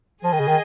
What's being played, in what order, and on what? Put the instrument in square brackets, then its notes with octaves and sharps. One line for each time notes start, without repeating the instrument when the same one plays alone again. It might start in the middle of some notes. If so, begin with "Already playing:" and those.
[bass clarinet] F3 [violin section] G#4 D#5 G#5
[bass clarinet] D#3
C#3
D#3